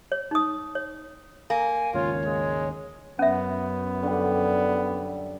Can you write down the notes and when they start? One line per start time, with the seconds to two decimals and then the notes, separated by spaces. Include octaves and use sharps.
0.12 C#5
0.31 D#4 D#6
0.75 C#5
1.50 A#3 G#5
1.94 D#2 G#2 C#3 F4 C#5
2.26 G#3
3.19 F#2 B3 C#4 E5
4.03 D3 G3